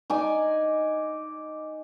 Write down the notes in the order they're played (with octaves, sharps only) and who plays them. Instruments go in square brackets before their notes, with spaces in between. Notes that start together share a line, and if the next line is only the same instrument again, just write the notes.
[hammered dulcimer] D#4 D5 G#5